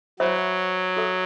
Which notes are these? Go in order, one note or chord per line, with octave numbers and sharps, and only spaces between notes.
F#3 C5 E5 B5
F#4 A4 E5